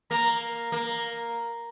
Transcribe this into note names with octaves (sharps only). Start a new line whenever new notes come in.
A#3 A#5
A#3